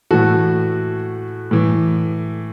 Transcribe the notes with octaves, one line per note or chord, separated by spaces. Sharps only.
A2 E3 F#4 A4
A2 E3